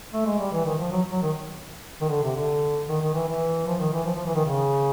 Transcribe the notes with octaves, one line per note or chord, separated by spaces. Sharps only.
A3
G#3
G3
E3
D#3
F3
F#3
F#3
D#3
D#3
D3
C3
D3
D#3
D#3
E3
E3
F3
D#3
E3
F3
F3
E3
D#3
C#3